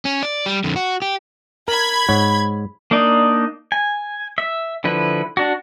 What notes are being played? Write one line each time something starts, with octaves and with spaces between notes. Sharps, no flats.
C#4
D5
G3
F2 D3
F#4
G4
A#4 B5 G#6
G#2 C#5 F#5
A#3 D4 D#4 D5 D#5
G#5
E5
D3 F3 E4 B4
D4 F#4